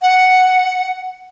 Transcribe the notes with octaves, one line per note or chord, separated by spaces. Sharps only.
F#5